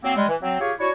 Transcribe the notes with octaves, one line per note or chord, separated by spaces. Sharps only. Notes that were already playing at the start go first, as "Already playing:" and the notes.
F#3 A#3 C4
G3 G#3
E3
F#3 C4
F4 G4 G#4 C#5
D4 E4 F#4 C#5